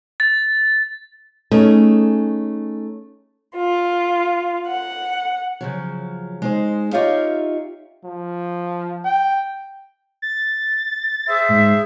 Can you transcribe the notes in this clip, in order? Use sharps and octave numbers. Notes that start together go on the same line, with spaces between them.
A6
A3 C#4 D#4 G#4
F4
F#5
C#3 F3 F#3
G#3 D#4 C5
D#4 F4 G4 C#5 E5 F5
F3
G5
A6
G#4 C5 E5
G#2